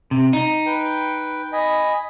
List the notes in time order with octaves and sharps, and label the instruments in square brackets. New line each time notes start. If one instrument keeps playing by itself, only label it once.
[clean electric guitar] C3
D#4
[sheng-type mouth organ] B4 G5
D#5 G#5 B5